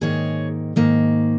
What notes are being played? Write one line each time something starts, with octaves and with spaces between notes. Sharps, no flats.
G#2 D#3 A#3 G#4 C#5
G#2 D#3 A#3